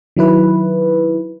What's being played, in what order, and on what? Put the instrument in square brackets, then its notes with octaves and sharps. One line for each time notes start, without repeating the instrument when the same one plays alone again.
[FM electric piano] D#3 F#3 E4 B4